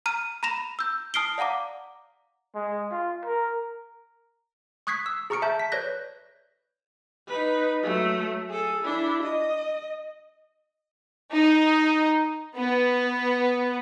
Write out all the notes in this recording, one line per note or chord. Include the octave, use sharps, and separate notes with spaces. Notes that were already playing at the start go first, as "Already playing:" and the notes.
A#5 F6 D#7
A#5 B5 A#6 E7 F7
E6 G6
A5 D#6 F6 C7 D7 G7
D5 F5 F#5 A#5 D6
G#3
F4
A#4
C#6 D#6 F#6 G#6 B6 C7
E6
G#4 A#5 C#6 F6 C#7 D7
E5 A5 G6
B6
B4 C#5 D5 F#6 G6 A#6
D#4 B4
F#3 A3
G#4 A4
D4 E4
D#5
D#4
B3